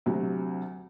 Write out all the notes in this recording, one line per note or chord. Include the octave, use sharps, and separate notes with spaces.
D2 C3 F#3